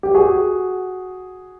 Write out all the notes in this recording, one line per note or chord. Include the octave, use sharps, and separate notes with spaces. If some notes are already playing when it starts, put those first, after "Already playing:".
G4
F#4 G#4